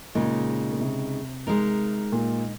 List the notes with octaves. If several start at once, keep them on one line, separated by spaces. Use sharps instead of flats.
A#2 C#3 G#3 D#4
A#2
C3
G#3 D#4 A#4
A#2